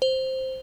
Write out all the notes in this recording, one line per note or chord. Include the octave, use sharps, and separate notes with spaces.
C5